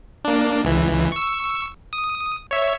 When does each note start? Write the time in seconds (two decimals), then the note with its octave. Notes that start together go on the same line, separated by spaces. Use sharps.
0.24 A#3 D4
0.64 C#2 E3
1.12 C#6 E6
1.93 D#6
2.51 C#5 E5